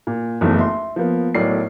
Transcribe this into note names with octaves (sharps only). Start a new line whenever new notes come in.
A#2
F#1 B1 E2 E3 A3 D#4
E5 C6
F3 A#3 B3
B1 A2 F#3 A#4 D5 C7